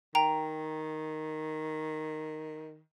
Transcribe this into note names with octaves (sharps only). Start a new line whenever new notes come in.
D#3 G5 A#5